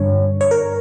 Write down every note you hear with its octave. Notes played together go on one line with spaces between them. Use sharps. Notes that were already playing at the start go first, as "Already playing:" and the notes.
Already playing: G2 D3 C#5
C#5
A#4